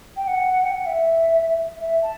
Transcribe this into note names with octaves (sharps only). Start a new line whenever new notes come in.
G5
F#5
G5
F#5
E5
E5
A5